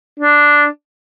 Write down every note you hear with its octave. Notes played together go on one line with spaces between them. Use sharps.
D4